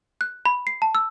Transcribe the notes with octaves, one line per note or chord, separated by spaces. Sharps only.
F#6
B5
C7
A5
E6